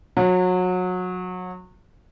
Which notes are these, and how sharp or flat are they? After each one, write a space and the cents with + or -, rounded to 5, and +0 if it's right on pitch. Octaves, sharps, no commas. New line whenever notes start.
F#3 -25